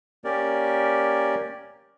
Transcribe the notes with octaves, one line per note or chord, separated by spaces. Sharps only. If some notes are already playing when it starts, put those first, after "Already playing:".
A#3 C#4 G4 A#4 D5